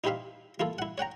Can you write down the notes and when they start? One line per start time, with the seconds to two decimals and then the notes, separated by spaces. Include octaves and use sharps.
0.04 D#4 E4 G4 C5 E5 F5
0.60 A#3 E4 F4 A4
0.78 E4 F#5
0.98 C#5 F#5 G5 A#5